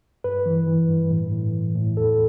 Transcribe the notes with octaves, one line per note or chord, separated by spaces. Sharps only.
G2 B4
E3
E3
G2
A2
A2
E3
A2
E2 A4